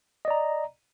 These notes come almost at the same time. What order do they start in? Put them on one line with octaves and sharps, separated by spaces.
D#5 D5 A#5